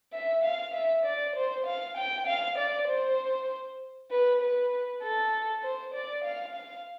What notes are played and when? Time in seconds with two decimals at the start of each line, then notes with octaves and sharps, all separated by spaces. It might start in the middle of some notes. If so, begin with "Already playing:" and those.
0.13 E5
0.44 F5
0.74 E5
1.05 D5
1.36 C5
1.66 F5
1.97 G5
2.27 F5
2.58 D5
2.88 C5
4.11 B4
4.41 B4
5.03 A4
5.63 C5
5.94 D5
6.24 F5
6.55 F5